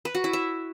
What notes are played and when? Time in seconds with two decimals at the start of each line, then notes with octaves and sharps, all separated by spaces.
0.05 B4
0.15 F#4
0.24 E4
0.33 E5